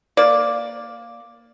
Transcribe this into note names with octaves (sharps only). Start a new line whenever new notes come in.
A#3 D5